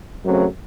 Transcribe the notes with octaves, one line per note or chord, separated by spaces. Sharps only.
F#2 C#3 F#3 A3 C4